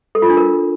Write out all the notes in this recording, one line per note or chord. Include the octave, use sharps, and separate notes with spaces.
A4
F4
D4
A#4